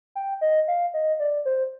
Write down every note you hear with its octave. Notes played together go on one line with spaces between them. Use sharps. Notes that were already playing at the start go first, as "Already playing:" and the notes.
G5
D#5
F5
D#5
D5
C5